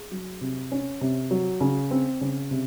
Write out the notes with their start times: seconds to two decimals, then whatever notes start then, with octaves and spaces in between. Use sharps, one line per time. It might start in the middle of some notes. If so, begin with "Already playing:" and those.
Already playing: G#4
0.11 F#3
0.41 C3
0.72 C#4
1.01 C3
1.31 F#3
1.61 C#3
1.91 C4
2.21 C#3
2.51 C3